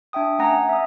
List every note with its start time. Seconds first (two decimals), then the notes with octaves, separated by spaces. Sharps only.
0.13 D4 E5 G5 D#6
0.39 A3 C#4 F#5 G#5 A#5 A#6
0.69 E5 D#6